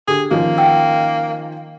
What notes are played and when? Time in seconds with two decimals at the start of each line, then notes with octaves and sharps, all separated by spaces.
0.08 D3 G4 G#4
0.31 D#3 F3 A#3 C#4
0.58 F#5 G5 E6